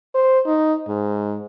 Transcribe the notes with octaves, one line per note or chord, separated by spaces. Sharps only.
C5
D#4
G#2